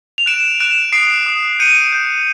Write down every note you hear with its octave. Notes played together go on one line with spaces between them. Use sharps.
F7
F#6 D7 E7
F#6 D7 E7
D#6 C7 D7
D#6
G6 C#7 D#7
G6